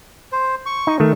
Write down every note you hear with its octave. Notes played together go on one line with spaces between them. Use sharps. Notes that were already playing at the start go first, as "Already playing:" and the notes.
C5
C#6
D#4
D#3 A3